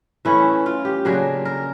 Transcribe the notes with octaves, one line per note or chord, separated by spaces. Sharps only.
E3 A3 C#4 E4
F4
G4
C#3 F#3 A#3 D4 G#4
A#4